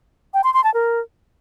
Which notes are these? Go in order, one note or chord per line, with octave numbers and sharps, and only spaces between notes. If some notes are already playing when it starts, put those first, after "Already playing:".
G5
C6
C6
A5
A#4